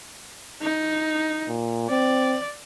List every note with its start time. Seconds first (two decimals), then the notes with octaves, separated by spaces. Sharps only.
0.62 D#4
1.48 A#2
1.90 C4 D5